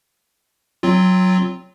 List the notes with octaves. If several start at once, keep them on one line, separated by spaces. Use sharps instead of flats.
F#3 C4 F4